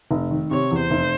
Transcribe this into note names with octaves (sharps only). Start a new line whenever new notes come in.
F1
D#3
C3 C#5
E2
C5
F1